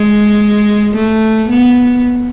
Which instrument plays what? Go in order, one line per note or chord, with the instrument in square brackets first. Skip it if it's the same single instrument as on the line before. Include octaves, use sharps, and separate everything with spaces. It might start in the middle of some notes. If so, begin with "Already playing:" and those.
Already playing: [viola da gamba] G#3
A3
B3